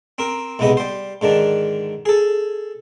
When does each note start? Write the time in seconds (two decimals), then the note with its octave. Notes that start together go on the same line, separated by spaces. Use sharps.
0.18 C4 A#4
0.59 B1 G#2 C3 B3 D#5
0.77 G3 C5
1.21 G#2 D3 D#3 D4
2.06 G#4 A4